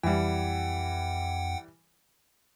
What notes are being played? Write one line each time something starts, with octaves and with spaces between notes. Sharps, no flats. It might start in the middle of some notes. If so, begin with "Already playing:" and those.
F2 E3 G3 F#5 G5